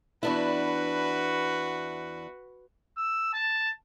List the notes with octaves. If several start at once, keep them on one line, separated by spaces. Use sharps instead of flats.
E2 D4 E4 F#4 B4
E6
A5